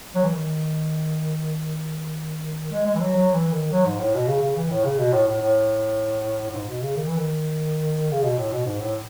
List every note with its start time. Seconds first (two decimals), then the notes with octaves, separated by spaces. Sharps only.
0.15 F#3
0.23 E3
0.32 D#3
2.72 G#3
2.86 G#3
2.94 E3
3.00 F#3
3.15 F#3
3.33 E3
3.52 D#3
3.71 F#3
3.85 G#2
3.99 A2
4.14 B2
4.28 C#3
4.41 C#3
4.56 E3
4.70 A2
4.84 C#3
4.99 B2
5.12 A2
5.27 A2
5.41 A2
6.48 A2
6.54 G#2
6.68 B2
6.82 C#3
6.96 D#3
7.07 E3
7.17 D#3
8.11 C#3
8.24 B2
8.38 A2
8.52 B2
8.66 G#2
8.80 A2